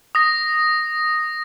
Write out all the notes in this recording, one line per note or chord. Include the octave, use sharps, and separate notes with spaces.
D#6 A#6